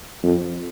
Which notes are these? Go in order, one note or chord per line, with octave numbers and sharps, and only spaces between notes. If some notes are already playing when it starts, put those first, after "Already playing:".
F2